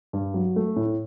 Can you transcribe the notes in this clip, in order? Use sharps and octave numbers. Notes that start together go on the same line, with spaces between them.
G2
F#3
A3
A2